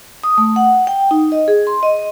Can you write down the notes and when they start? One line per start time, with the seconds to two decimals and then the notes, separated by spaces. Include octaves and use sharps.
0.24 D#6
0.38 A3
0.56 F#5
0.87 G5
1.11 D#4
1.32 D#5
1.48 G#4
1.67 C6
1.83 D#5